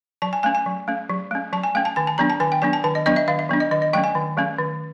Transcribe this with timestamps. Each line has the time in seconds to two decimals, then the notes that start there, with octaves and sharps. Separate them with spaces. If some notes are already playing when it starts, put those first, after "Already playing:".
0.22 F#3 A5
0.33 G#5
0.43 A3 C#4 G#5
0.55 G#5
0.66 F#3
0.88 A3 C#4
1.10 F#3
1.31 A3 C#4
1.53 F#3 A5
1.64 G#5
1.75 A3 C#4 G5
1.85 A5
1.96 D#3 G#5
2.07 A5
2.18 F#3 B3 D4 A#5
2.30 A5
2.40 D#3 G#5
2.52 G5
2.62 F#3 B3 D4 G#5
2.73 A5
2.84 D#3 A5
2.95 D#5
3.06 F#3 B3 D4 D#5
3.16 E5
3.28 D#3 F5
3.39 E5
3.49 F#3 B3 D4
3.60 D#5
3.71 D#3 D#5
3.82 D#5
3.93 F#3 A3 C#4 G5
4.04 G#5
4.15 D#3
4.37 F#3 A3 C#4
4.59 D#3